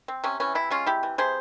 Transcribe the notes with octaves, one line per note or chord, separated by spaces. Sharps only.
C4
C3 C#4
E3 C#4
C3 E4
G#3 C#4 F4
C3 E4 G4
E3
C3 G#4 C5